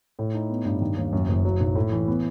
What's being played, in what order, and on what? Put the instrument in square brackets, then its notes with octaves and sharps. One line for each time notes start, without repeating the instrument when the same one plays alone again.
[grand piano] A2
D#4
B3
G2
D#3
D#2
F#2
F#1
F#3
B1
A2
E3
B3